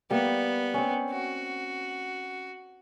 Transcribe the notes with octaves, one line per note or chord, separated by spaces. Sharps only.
G3 A#3 B3
C4 C#4
F#4